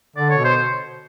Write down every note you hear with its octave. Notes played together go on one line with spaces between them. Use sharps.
D3 D5
C#5
B2
C5